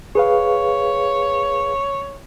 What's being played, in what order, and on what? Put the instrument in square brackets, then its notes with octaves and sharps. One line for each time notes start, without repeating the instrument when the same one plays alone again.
[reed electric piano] G#4 B4 F5 [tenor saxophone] C#5